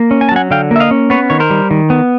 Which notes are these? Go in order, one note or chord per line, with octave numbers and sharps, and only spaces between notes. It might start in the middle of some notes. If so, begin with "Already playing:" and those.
Already playing: A#3
C#4
G#5
A5
F#3 F#5 G#5
D3 F5 G5
A#3 E5
D#5 F5
C#4
B3 B4 C#5
D#3 C#5
A#4 C5
G3
D#3
B3